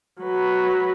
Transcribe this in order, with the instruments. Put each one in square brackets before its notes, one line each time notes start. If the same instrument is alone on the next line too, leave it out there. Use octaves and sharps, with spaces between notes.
[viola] F#3 B4